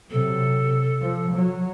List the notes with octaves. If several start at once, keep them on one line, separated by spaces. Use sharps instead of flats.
C3 F#3 A4
F3
F#3